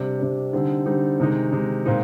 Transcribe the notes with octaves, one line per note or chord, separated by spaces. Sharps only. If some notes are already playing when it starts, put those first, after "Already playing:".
Already playing: C3 G3 D4
C3 G3 D4
D3 G3 C4 D#4
D3 G3 C4 D#4
C3 D#3 G#3 D#4
C3 D#3 G#3 D#4
A#2 G#3 C4 D#4